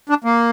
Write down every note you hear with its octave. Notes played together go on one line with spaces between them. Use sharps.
D4
A#3